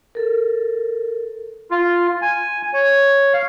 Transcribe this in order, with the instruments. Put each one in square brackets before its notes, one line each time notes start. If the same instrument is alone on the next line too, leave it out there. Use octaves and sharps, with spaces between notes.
[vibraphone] A4 A#4
[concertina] F4
G#5
C#5
F5